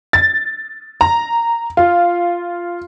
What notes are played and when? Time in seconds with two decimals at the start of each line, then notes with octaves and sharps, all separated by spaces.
0.13 A6
1.01 A#5
1.77 F4